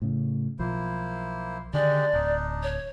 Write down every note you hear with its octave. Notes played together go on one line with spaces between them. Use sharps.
A2 C#3
B1 F3 A#3 E4 C5
D3 D#3 G#3 D4 G4 D5
D1 D4 D#4
C#5